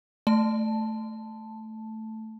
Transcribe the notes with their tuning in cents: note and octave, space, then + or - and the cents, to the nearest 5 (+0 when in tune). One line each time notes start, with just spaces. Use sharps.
A3 +0 A5 +0